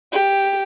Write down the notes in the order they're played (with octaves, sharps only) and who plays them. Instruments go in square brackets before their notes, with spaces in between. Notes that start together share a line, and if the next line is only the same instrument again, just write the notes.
[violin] G4